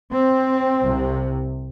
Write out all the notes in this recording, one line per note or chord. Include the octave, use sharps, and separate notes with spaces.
C4
C2 C3